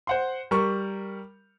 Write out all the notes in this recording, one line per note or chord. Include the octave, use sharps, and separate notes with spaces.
C5 F#5 C6
G3 A#4 C#6